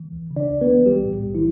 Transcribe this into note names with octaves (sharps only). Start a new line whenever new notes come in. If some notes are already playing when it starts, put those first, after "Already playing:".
Already playing: E3
C#2
C#3
D4 D5
C#2
B3 B4
E3
B1 G3 G4
A2
B1
E3 E4